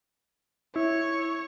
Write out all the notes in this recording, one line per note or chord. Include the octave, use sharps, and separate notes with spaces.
E4 C#5